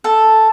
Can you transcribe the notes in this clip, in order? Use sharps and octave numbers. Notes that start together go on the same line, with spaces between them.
A4